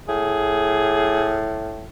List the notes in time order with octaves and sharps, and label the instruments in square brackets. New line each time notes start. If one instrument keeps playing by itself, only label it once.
[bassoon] A2 [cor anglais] G#4